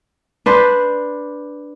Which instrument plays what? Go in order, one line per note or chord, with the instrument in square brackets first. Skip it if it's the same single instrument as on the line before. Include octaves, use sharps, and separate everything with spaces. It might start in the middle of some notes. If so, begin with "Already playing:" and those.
[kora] D4 B4 C5